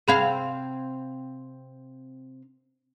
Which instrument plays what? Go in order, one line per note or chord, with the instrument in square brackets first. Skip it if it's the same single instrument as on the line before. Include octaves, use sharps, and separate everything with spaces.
[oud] C3 C4 F5 [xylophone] G#4 B5 G#6